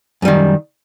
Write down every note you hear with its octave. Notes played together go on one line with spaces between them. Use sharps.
F#2 D#3 G3